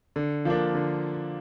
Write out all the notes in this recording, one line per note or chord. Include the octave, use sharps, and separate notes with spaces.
D3
F3 A#3 D4
D3